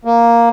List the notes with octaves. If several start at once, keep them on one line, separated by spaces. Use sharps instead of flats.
A#3